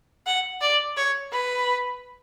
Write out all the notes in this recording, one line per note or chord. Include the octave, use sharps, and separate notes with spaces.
F#5
D5
C#5
B4